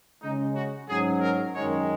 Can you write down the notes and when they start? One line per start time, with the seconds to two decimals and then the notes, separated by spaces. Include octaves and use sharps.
0.22 C#3 G#3 C#4 D#4
0.55 F#4
0.89 G#2 F#3 C#4 G#4
1.21 A#4
1.55 F#2 D#3 G#3 C#5